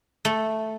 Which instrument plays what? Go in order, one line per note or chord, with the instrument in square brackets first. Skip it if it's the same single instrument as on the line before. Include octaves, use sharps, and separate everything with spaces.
[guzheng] A3